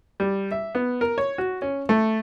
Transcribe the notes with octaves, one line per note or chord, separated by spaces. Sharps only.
G3
E5
B3
A#4
C#5
F#4
C#4
A3